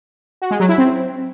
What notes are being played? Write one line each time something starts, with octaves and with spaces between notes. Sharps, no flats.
F#4
G#3
F#3
E4
C4